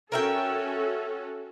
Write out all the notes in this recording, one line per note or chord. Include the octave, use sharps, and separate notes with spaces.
C#4 F#4 A4 A#4 E5 G5